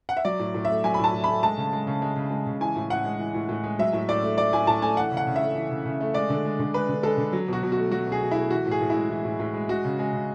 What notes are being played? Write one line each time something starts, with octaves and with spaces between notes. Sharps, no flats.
F#5
E5
F#3 D5
A2
A2
A3 E5
F#3 G#5
B5
A2 A5
A2
A3 B5
G#3 A5
C#3
G#3
C#3
G#3
C#3
G#3
C#3
E3 G#5
A2
A2 F#5
G#3
E3
A2
A2
G#3
F#3 E5
A2
A2 D5
A3
F#3 D5
A2 G#5
A2 A5
A3 G#5
E3 F#5
C#3
F#5
C#3
E5
A3
E3
C#3
C#3
A3
G#3 D5
D3
G#3
D3
G#3 B4
D3
G#3 A4
D3
F#3
B2 F#4
B2
F#4
A3
F#3 F#4
B2
G#4
B2
E4
A3
E3 F#4
A2
G#4
A2
E4
G#3
E3
A2
A2
G#3
G#3 F#4
C#3
G#3
C#3